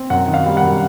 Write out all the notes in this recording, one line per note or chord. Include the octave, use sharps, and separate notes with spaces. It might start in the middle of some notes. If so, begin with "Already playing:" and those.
Already playing: C4
F#2 F#5
D#3
F5
G3
F#5
F#2